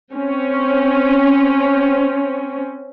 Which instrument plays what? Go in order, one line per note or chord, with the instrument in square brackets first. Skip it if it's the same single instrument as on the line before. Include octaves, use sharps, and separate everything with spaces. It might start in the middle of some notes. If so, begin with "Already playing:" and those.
[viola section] C4 C#4